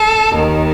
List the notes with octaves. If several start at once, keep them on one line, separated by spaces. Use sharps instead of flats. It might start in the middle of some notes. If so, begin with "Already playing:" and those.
Already playing: A4
D#2 D#3